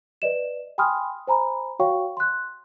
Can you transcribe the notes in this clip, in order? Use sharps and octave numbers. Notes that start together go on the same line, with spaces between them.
B4 D5 D#5 E7
G5 G#5 B5 C6 D#6 F6
C5 G#5 A#5 B5
F#4 C#5 F5 G5 C#6
C6 F#6